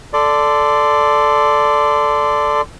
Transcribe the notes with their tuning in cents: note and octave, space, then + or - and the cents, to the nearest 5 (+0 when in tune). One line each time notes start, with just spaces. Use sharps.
A4 +0 D5 +0 C6 -20